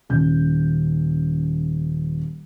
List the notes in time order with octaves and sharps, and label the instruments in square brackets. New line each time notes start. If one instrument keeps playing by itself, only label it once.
[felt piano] D#1 C#4 G6